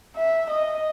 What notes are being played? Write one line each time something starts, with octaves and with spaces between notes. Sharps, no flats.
E5
D#5